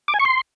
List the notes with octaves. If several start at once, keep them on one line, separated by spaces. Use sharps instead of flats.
D6
G#5
C#6
C6